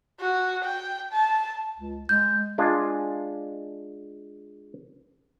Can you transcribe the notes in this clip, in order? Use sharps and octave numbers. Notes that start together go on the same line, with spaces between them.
F#4
G5
A5
C#2
G#3 G6
G#3 D4 F4